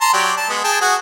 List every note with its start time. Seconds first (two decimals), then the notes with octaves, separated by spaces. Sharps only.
0.01 A5 A#5 C6
0.13 F#3 G4 D5
0.37 A5
0.49 G#3 B3
0.64 G#4 G5 A5
0.81 F#4 G#4 F#5